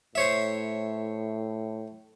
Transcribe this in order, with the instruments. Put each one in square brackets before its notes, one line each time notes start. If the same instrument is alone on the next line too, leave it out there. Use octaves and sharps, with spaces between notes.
[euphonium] A2 [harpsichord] C5 C#5 E5